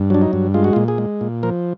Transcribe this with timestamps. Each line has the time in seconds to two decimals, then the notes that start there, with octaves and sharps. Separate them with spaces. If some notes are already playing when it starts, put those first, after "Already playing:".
Already playing: G2
0.10 F#3 D4
0.22 D#4
0.33 G2
0.54 G#3 F4
0.64 F#4
0.73 F4
0.76 A#2
0.88 G#4
0.98 G#3
1.21 A#2
1.43 F3 A#4